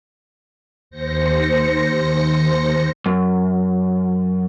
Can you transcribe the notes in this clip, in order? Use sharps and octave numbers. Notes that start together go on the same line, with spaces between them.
D#2 C5 A#6 C#7
F#2